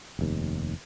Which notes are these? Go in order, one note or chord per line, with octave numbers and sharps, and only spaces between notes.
F1 D#2